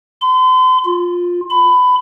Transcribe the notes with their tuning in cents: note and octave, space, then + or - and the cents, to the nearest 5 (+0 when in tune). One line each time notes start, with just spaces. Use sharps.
C6 -40
F4 +15
B5 +20